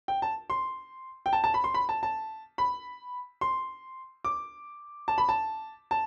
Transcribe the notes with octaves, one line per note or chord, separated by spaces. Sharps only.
G5
A5
C6
G5
A5
A5
B5
C6
B5
A5
A5
B5
C6
D6
A5
B5
A5
A5